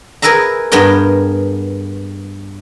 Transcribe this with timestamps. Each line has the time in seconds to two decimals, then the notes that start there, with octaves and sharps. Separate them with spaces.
0.22 G#4 A#4 B4 E5 A#5
0.72 G2 B3 G#4 A#4 G5